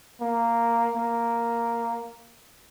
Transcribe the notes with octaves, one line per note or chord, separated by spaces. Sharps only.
A#3
A#3